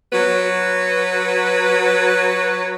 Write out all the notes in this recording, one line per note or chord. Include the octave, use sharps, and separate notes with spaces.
F#3 F#4 B4